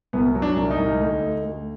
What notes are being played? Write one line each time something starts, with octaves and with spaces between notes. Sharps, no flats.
C2 B3
F#3
D4
C2
D#4
C2
D2
D2
D2